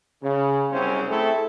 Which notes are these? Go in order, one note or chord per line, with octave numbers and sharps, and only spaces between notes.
C#3
C2 F#2 C4 C#4 G#4 C5
A3 C4 E4 G#4 A4